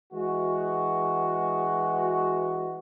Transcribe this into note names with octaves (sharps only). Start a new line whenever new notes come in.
E3 G#3 F#4